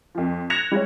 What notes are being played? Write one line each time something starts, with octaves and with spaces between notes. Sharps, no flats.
F2 F3
F#6 G#6 A#6 C#7 E7 F7
G3 G#3 C#5